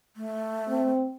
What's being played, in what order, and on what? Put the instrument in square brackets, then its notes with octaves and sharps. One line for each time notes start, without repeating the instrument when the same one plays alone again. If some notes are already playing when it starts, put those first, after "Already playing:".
[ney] A3
[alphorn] C4